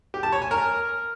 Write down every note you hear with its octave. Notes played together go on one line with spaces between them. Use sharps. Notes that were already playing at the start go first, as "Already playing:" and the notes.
G4
A5
C#5
G#5
A#4